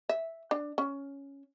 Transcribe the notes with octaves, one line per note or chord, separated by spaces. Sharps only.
E5
D4
C#4